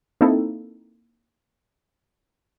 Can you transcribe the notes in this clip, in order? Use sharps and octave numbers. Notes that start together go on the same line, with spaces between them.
A#3 C4 D#4 E4 A4